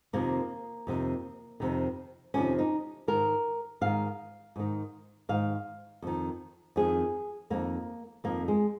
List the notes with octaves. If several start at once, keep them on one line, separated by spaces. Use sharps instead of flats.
F2 C3 D#3 A#3
F2 C3 D#3
F2 C3 D#3
F2 C3 D#3 C#4
D#4
G#2 D#3 A#4
G#2 D#3 F5
G#2 D#3
G#2 D#3 F5
F2 D#3
F2 D#3 G#4
F2 D#3 A#3
F2 D#3 A#3
G#3